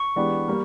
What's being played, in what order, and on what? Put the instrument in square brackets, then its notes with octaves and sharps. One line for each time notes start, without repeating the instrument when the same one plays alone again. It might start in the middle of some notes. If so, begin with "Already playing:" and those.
Already playing: [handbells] C#6
[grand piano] E3 G#3 B3 D4 G4
G3 A#3